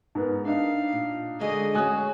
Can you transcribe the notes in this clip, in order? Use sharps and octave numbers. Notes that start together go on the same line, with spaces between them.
G#2 B3 A#4
D4 D#4 F5
A#2
D3 G#3 F#4 G#4 D#5
G#3 C#4 F#4 G#5 D#6 F#6